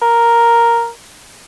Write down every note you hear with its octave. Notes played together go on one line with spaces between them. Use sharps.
A#4